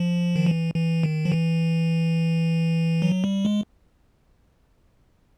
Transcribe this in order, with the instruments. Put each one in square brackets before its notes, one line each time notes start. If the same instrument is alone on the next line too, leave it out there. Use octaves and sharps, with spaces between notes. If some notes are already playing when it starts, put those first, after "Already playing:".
Already playing: [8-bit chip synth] F3
D#3
E3
E3
D#3
F3
E3
F#3
G3
G#3